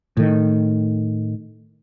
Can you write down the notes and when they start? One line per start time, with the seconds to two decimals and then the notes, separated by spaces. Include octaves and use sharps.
0.17 A2 D#3